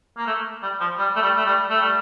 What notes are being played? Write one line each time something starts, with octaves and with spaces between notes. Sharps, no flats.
A#3
A3
G3
F3
G3
A3
G3
A3
G3
A3
G3